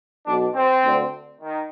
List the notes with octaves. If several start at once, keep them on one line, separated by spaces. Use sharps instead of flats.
B1 B2 D4
C4
D2 D3
D#3